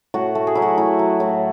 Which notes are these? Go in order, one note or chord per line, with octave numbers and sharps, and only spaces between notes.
A2 F#4
A3
G#4
F#3 E4
F#4
A3 E4
F#3
A2